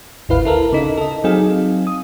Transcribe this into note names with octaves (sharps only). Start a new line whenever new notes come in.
G#1 D2 E4 B4 F5
E4 A4 A#4
C#3 D#4
A4 D#5
F#3 C4 D#4 G#4 F5
D#6